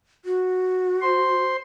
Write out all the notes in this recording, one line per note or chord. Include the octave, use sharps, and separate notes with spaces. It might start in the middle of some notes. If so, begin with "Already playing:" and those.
F#4
C5 C6